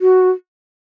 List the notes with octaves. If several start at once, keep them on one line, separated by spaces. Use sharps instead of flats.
F#4